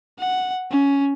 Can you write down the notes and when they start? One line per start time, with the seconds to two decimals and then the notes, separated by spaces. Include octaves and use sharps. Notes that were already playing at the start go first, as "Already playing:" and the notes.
0.19 F#5
0.71 C#4